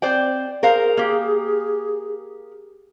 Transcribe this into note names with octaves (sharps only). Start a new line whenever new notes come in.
C4 C5 D5 G5
G#4 A#4 C5 F5
A#3 G4